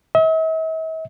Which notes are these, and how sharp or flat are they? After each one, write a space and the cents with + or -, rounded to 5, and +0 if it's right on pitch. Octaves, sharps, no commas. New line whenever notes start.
E5 -45